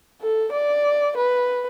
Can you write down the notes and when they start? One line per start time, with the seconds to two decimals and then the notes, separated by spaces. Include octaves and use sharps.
0.21 A4
0.52 D5
1.17 B4